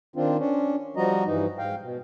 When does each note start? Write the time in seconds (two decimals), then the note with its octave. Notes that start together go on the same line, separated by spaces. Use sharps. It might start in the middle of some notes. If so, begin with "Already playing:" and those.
0.16 D#3 C4 D4 F4
0.38 C#4 D4
0.97 F3 G3 F#4 D#5 A#5
1.26 G2 E3 D#4
1.58 G#2 F5 G5
1.82 B2